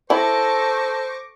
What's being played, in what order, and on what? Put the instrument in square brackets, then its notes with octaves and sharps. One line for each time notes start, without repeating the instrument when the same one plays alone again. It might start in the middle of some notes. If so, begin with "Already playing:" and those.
[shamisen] E4 [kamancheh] A4 [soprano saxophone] C5 [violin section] C#6 D6 A#6